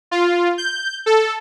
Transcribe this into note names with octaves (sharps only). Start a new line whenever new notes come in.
F4
G6
A4